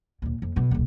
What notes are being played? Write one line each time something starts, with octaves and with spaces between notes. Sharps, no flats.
D#2 A#2
F2
B1 B2
D#1 B1